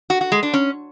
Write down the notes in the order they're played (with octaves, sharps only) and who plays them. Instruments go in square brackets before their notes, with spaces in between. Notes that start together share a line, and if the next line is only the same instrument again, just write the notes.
[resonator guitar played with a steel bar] F#4
F#4
G#3
D4
C#4